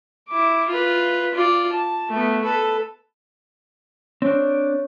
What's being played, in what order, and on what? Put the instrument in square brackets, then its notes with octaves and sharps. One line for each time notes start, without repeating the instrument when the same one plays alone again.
[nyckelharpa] E4 D6
F4 B4
F4 D5
A5
A3 B3
A4 B4
[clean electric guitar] C4 D4 [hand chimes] C#5